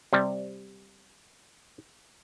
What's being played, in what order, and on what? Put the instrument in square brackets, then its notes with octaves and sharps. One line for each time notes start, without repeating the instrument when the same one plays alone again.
[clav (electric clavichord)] C3 G3